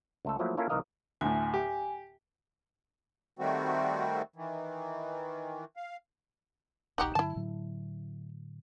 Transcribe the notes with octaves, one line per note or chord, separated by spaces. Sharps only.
C#2 A3 A4
F3 F#3 A3 A#3 E4
A#3 C#4 E4 F4 A4 A#4
C2 D#3 E3 A#4 D#5 F5
D2 A2 G#5
G4
D#3 G3 A3 C4 F#4
D#3 E3
F5
D#1 A#1 D#4 F#4 G4
G2 D3 F#3 E4 A5
A2 D3 F#3